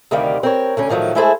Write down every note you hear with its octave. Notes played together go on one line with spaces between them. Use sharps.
D2 C3 D#3 G3 F5
C4 A#4 C#5
D2 D3 C#4
A2 D#3 F3 F#3 A3
G#3 A3 E4 G#4 A4 C5